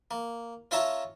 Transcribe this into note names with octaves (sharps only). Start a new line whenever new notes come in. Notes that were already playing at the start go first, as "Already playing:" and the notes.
A#3
C#4 F4 C#5 E5 A5 A#5